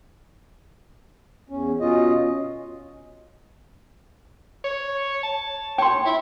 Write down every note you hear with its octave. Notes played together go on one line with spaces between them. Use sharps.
E2 C#4
B2 C#4 F4 D#5
C#5
A5
C#5 G5 C6
E4